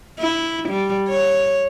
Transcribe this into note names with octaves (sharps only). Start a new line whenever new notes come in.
E4
G3
C#5